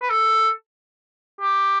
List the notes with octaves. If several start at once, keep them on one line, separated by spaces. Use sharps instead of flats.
B4
A4
G4